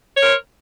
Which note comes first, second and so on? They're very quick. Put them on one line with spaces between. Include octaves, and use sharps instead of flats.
C#5 A#4 C5